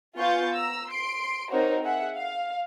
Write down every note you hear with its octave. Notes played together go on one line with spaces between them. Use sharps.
B3 F4 G#5 C#6 G6 A6
A#5 E6
C6 C7 D7
C4 D#4 F#4 A#4 C5 C#5
G#4 E5 F#5
F5